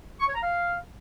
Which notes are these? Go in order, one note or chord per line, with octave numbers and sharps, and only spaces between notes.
C#6
C#5
A#5
F5